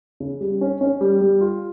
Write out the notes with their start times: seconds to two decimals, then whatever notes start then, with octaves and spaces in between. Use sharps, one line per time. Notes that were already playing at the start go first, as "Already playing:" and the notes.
0.20 C#3
0.41 G3
0.61 C#4
0.81 C#4
1.01 G3
1.21 G3
1.41 F4